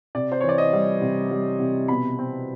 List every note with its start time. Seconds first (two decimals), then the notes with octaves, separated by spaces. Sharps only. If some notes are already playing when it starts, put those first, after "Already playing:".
0.15 C3 D5
0.32 C5
0.41 E3 C#5
0.49 D5
0.58 D#5
0.73 G3
1.01 C3
1.31 G3
1.60 C3
1.88 B2 B5
2.19 C4